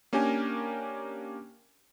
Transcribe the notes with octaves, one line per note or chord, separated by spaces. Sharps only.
A#3 C#4 D4 G4 A#4 G#5